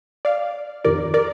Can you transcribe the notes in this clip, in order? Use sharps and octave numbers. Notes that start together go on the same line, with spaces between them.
D5 F5
F2 D#3 G3 A#4 D5
A#4 D5